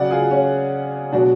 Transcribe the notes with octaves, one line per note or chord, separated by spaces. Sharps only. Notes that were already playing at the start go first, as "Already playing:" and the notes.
Already playing: C#3 F#3 D5 F#5
F4 G#4
C#4 F4
B2 F#3 D4 F#4